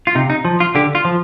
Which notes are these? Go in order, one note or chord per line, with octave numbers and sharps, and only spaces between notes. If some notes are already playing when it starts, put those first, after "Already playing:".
F4
C3 D#4
D#4
F3
F4
D3 G4
F4
F3